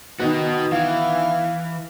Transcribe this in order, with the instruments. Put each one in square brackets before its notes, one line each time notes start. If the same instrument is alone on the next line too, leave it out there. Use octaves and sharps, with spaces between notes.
[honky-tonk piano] D#3 B3 [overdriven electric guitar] F#4 D#5
[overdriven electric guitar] E3 [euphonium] E4 [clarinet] F5